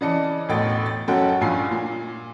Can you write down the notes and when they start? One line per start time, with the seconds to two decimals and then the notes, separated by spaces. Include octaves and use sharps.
0.01 C#3 E3 D5 D#5 A5 C#7
0.49 E1 A1 D2 A2 G5 A6
0.86 A6
1.08 F#1 F#2 C#4 A4 F#5 G5
1.41 A#1 G2 C#3 F4 G#5 C7
1.71 A#2